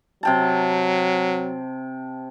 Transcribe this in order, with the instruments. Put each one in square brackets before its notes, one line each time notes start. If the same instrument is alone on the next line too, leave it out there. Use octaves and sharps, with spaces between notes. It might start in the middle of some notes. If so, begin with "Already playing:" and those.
[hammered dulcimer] C3 G5 A5 [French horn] F#3